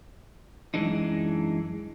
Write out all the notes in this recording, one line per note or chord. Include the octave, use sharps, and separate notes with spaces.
F#2 E3 G#3 D4 D#4